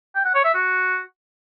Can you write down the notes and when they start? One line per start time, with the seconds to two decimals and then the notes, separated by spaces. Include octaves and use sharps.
0.15 G5
0.25 F#5
0.35 C#5
0.44 E5
0.54 F#4